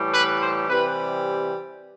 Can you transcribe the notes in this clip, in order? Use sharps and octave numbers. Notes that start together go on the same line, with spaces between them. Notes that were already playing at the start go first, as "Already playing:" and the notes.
Already playing: A2 E3 G3
B4
C5
C3 E3 G3 B4